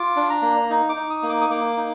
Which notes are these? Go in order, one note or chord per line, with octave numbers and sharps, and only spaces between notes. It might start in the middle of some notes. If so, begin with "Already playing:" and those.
Already playing: F4 D6
D4
A#5
A#3
D#4
D6
D#4
D#6
A#3
D6
D#6
A#3 D6
D#4